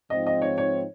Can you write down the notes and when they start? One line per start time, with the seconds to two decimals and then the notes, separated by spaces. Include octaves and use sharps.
0.10 G#2 F3 C4 D#4 D#5
0.27 D#5
0.42 C#5
0.58 C#5